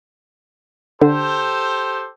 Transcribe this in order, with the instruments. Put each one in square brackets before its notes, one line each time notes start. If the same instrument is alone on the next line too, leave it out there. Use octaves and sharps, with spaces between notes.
[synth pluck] D3 [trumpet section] G4 A4 C5